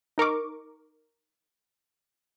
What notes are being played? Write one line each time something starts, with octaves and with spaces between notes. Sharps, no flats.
D#4 A#4 C#6 D6